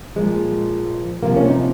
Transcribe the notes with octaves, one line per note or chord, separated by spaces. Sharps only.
A#2 F3 G#3
C3 F3 A#3
C#4
D#4